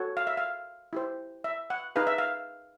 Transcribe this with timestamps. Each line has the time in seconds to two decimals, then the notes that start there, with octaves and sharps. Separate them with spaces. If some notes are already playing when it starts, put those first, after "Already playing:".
Already playing: F#4 A4 C#5
0.17 F5
0.27 E5
0.37 F5
0.93 E4 G4 C5
1.44 E5
1.70 F#5
1.96 D#4 G#4 B4 F5
2.07 E5
2.18 F5